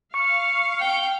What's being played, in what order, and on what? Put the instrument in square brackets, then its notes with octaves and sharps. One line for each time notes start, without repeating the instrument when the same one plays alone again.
[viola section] F5 [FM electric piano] C#6 [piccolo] C#7
[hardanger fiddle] G5